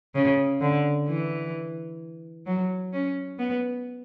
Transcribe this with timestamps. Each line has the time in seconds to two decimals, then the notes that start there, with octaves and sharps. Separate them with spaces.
0.15 C#3
0.61 D3
1.09 E3
2.46 F#3
2.93 C#4
3.39 B3